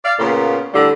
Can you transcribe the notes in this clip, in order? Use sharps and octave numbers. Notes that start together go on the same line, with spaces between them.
D5 F5
A#2 C#3 A#3 B3
A2 D3 G3